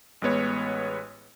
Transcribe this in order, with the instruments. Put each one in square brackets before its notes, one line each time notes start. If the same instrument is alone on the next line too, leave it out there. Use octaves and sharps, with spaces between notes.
[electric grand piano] A1 G#3 B3 C#5